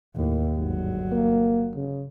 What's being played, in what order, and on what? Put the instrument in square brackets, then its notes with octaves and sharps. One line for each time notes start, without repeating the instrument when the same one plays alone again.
[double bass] D#2 [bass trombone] A2
[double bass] G1 F#3 [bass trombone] G#2
[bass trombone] A#3
C#3